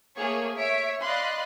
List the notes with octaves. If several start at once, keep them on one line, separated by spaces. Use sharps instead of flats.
A3 A#3 G#4 C#5
C#5 E5 B6 D7
D5 D#5 F5 B5 C6 F#6